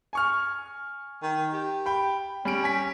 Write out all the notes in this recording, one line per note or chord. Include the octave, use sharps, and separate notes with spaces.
G#5 C#6 F6
D#3
G4
G5 B5
G3 C#4 D7
G#5 B6